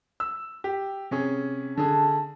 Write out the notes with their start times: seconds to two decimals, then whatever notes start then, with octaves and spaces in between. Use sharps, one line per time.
0.20 E6
0.64 G4
1.11 C3 C#4 G#4
1.77 D3 G#4 A5